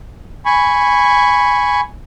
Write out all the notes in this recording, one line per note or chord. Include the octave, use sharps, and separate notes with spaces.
G#5 B5 C#6